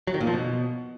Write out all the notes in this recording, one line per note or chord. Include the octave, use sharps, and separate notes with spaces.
F#3
D#3
A#2
F3
B2